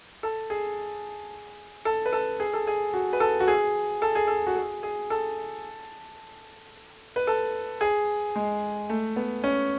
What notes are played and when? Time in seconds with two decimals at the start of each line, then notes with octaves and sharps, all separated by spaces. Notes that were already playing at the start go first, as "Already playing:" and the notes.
0.23 A4
0.50 G#4
1.85 A4
2.05 B4
2.13 A4
2.40 G#4
2.53 A4
2.67 G#4
2.94 F#4
3.13 B4
3.20 A4
3.40 F#4
3.48 G#4
4.02 A4
4.15 G#4
4.28 A4
4.47 F#4
4.56 G#4
4.83 G#4
5.10 A4
7.16 B4
7.27 A4
7.81 G#4
8.36 G#3
8.89 A3
9.16 B3
9.44 C#4